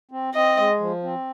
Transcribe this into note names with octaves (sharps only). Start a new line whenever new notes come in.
C4
C4 D#5
G#3
F3
C4